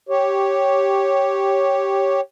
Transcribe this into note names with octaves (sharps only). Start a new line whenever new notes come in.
G4 C#5